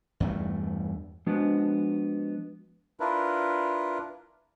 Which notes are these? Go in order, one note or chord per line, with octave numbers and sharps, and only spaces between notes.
E2 G2 A3
F3 G#3 B3 D4 F#4
D4 E4 F4 A#4 B4